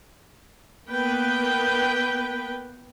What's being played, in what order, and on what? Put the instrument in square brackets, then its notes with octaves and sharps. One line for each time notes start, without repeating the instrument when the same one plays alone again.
[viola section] A#3 B3 B4 G5